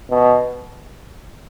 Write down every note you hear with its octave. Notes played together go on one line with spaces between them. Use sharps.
B2